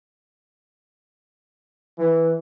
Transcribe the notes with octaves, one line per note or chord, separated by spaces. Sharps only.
E3